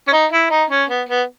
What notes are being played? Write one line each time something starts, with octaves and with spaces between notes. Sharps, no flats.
C#4
D#4
E4
D#4
C#4
B3
B3